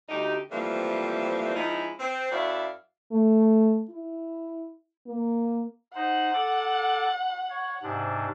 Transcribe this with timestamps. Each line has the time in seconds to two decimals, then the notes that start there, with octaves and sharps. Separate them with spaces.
0.09 D2 D#4 G4
0.51 E3 F3 G3 A3 A#3 C4
1.55 F3 G#3 C#4 D#4 E4
1.99 C4
2.32 F#2 E4 F#4 D5 E5 F5
3.12 A3
3.90 E4
5.07 A#3
5.95 D#4 C5 F#5
6.34 A4 D6
7.50 C#5
7.83 G#2 C3 D4